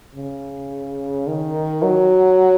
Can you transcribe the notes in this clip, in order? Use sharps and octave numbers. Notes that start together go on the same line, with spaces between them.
C#3
D#3
F#3